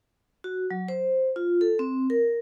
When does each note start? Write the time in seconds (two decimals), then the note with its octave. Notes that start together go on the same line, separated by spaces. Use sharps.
0.44 F#4
0.71 F#3
0.88 C5
1.36 F4
1.61 A4
1.79 C4
2.10 A#4